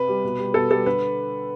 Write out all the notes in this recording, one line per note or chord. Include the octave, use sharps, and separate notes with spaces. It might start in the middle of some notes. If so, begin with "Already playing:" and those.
Already playing: C3 B4
G3
B2
G3
B2 A4
G3 A4
D3 B4